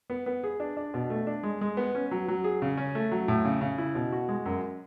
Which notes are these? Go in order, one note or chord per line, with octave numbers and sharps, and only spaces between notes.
B3
B3
G#4
D4
D4
B2
A3
D4
G#3
G#3
B3
C#4
F#3
F#3
G#4
C#3
C#4
A3
F#3
A2
C#3
C#3
E4
B2
F#4
G#3
F#2